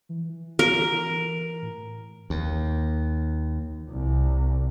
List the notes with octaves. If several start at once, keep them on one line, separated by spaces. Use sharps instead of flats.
E3
E3
A#4
A2
D#2
C2